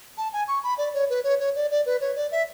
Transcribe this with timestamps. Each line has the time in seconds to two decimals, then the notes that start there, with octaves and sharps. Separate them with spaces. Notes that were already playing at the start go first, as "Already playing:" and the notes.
0.18 A5
0.33 G#5
0.48 C#6
0.64 B5
0.78 D5
0.94 C#5
1.10 B4
1.24 C#5
1.39 C#5
1.56 D5
1.71 D5
1.86 B4
2.01 C#5
2.16 D5
2.31 E5